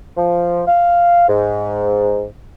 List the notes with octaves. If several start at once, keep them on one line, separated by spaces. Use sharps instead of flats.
F3
F5
G#2